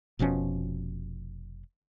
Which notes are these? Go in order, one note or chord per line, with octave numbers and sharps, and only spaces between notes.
F1 B2 F3 C#4